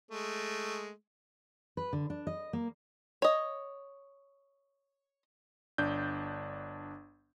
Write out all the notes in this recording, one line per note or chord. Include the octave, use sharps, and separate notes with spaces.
G#3 A3
B4
D3
D4
D#5
A#3
C#5 D#5
G1 D4 G6